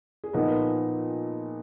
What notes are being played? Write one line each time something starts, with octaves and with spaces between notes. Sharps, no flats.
G#4
A#2 F3 B3 D#4 A#4